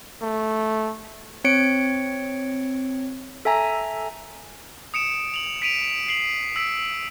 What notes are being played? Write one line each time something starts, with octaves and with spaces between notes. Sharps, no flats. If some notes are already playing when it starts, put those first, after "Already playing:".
A3
C4 C#5 C#7 D7
A4 E5 G#5 A#5
D#6 C#7 D7 E7
F7 F#7
B6 D7 D#7 F7
C7 F#7
E6 B6 D7